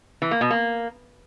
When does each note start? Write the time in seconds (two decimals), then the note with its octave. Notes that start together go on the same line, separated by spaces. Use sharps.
0.22 E3
0.31 A#3
0.41 B2
0.51 A#3